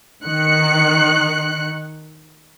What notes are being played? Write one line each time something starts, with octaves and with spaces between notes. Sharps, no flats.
D#3 F#6 C#7